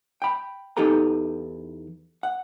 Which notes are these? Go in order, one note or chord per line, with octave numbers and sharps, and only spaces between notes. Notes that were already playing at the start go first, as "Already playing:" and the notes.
G5 B5
E2 D#4 G4 A4 B4 A#5
F#5